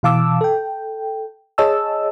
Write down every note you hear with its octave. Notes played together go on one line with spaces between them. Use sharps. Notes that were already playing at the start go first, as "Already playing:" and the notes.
B2 E3 F5 A5 D6 E6
A4 G5
G#4 C#5 D#5 A5 E6